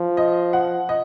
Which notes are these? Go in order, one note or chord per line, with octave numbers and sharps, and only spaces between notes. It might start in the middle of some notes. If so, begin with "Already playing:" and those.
Already playing: F3
D#5
F#5
D#5